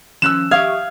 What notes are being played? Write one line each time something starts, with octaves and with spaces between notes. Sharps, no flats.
D#3 F3 C#4 E6 F#6 E7
G4 F5 C#6 D#6 G#6